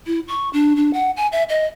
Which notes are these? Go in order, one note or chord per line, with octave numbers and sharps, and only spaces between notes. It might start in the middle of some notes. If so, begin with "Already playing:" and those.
E4
C#6
D4
D4
F#5
G#5
E5
D#5